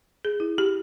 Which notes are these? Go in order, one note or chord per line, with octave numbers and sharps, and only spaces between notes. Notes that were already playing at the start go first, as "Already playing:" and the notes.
G#4
E4
G4